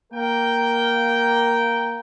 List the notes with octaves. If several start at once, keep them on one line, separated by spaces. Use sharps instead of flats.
A#3 A#4 G5